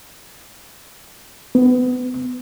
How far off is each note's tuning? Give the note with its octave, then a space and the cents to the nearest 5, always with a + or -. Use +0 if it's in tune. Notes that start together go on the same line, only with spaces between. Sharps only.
B3 +25